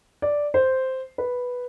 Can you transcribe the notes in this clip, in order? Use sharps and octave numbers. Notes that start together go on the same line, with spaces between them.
D5
C5
B4